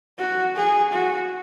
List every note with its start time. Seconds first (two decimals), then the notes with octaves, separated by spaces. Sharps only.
0.19 F#4
0.56 G#4
0.93 F#4